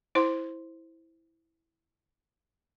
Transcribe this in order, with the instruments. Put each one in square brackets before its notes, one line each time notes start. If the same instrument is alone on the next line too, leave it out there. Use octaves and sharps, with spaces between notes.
[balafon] E4 C5 C6